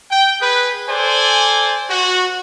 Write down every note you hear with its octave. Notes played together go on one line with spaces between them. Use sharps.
G5
G#4 B4
A4 C5 D5 G#5
F#4